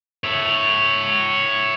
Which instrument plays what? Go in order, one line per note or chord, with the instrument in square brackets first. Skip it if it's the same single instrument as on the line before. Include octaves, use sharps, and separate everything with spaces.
[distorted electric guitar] C#5 E5